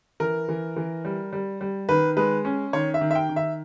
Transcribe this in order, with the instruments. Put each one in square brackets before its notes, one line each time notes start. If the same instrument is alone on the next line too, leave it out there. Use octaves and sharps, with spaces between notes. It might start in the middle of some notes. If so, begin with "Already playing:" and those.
[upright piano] E3 A#4
E3
E3
G3
G3
G3
D#3 B4
G#3 B4
C#4
D#3 C#5
E5
D#3
E5
G5
D#3
E5